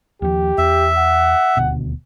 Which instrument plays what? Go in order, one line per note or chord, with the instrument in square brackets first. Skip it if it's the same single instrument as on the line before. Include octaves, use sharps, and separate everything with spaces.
[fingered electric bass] D#2 F3 [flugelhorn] G4
[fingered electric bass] E2 [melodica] E5
[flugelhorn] F#5
[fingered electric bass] D#1 D2 B2